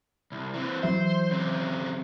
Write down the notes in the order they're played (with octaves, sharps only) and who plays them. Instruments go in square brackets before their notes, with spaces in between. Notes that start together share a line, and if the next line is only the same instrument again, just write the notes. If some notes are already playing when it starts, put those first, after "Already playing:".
[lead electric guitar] C2
E3 C4
[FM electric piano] E3 F#3 E5 [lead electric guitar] C5
[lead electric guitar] C#3 C4